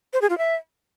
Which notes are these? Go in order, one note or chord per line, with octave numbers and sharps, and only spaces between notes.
C5
G#4
F4
E5